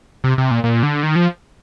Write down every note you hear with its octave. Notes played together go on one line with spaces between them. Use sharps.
C3
C3
A#2
A#2
D3
D#3
F3